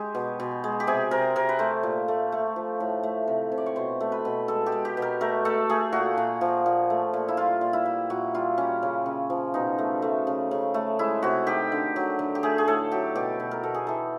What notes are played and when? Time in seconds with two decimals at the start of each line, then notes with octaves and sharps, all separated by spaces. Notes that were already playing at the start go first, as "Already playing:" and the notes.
Already playing: G#3 G4
0.15 B2
0.40 B2
0.64 G#3
0.80 G4
0.87 C3 G#4
1.11 C3 A#4
1.36 C3 A#4
1.49 B4
1.59 A3 C5
1.83 A#2
2.08 A3
2.32 A3
2.56 F3
2.80 A2
3.03 A3
3.28 C3
3.52 C3
3.58 D5
3.66 C#5
3.76 B2 C5
4.01 A3
4.12 B4
4.25 B2
4.48 G#3 A4
4.66 G4
4.72 G#3
4.85 G4
4.97 B2
5.02 A#4
5.21 A3 A#4
5.45 A3 A4
5.69 A3 G#4
5.92 A#2 F#4
6.17 A#2
6.41 F3
6.66 A#2
6.90 A3
7.14 A#2
7.28 E4
7.37 G3 F4
7.61 A#2
7.73 E4
7.85 G3
8.10 A#2 F#4
8.34 G3 F4
8.58 G3 C#4
8.82 C#3
9.06 C#3
9.30 F3
9.54 B2 D#4
9.79 A3
10.02 A3
10.27 C#3
10.51 C#3
10.74 A3
10.99 G#3 E4
11.23 C3 F#4
11.47 D#3 G4
11.72 D3
11.96 F#3
12.19 D3
12.35 G4
12.43 A3 G#4
12.58 G#4
12.68 A2 A4
12.92 F#3 G4
13.15 B2 G4
13.40 B2
13.51 A#4
13.63 B2 A4
13.74 G#4
13.87 E3 A4